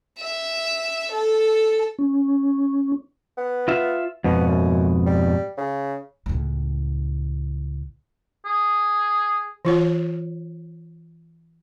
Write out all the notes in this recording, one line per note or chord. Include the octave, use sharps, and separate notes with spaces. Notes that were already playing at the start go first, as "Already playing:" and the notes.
E5
A4
C#4
B3
F4 E5
F2 G#2 B2 B3
F#2
G3
C#3
C#2 A2
G#4
E3 F4 C#5